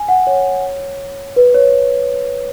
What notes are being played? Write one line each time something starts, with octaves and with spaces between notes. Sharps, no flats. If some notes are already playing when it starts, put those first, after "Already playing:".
Already playing: G#5
F#5
C#5
B4
C#5